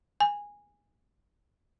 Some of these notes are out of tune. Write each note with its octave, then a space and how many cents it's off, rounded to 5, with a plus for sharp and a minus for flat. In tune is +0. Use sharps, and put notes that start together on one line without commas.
G#5 -15